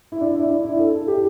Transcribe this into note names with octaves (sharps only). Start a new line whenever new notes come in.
E4
D4
E4
D4
E4
A4
G4